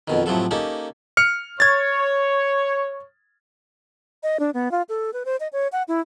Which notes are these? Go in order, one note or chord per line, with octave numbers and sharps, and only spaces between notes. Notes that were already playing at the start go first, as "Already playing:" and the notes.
F2 B2 D#3
A2 C3 F3 F#3 A4
A#3 C#4 D#4 G4 A4
F6 C#7
C#5 G#6 A6
D#5
D4
B3
F4
A4
B4
C5
D#5
C#5
F#5
E4